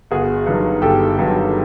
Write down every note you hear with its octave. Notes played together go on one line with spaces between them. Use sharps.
G1 F#4 G#4
G2 D#3 F#3
G1 G4 A4
G2 D#3 F#3